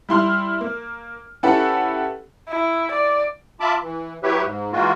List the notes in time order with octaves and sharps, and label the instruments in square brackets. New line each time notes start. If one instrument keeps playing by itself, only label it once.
[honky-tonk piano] G3 E4 C6 F6
A#3
C#4 E4 G4 A4 B4 F#5
[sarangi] E4
D5
[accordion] F4 E5 A5 B5 D6
E3
F#3 E4 G4 B4 C#5 E5
G#2
E3 G#3 A#3 F4 F#4